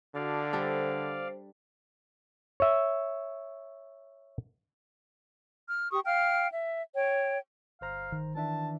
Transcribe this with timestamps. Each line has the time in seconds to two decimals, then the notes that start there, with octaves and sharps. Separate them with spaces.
0.15 D3 F#4 D5 F5 A5
0.53 G3 D4 A4 C5
2.60 C#5 E5
5.68 F6
5.91 G4 C#6 D#6
6.06 F5 G5 F6
6.52 E5
6.95 C#5 G5
7.81 G1 C5 F5 A#5
8.12 D#3
8.35 E3 D4 E5 A5